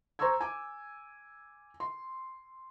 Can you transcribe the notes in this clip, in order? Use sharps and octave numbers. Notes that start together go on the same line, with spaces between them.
C5 A#5 C6 C#6 E6 G#6
G#5 D6
C6